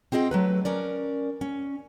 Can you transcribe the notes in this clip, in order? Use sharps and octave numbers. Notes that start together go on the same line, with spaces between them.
C4 F4 G#4 D#5 G5
F#3 A3 B4
C#4 A#4 D5
C#4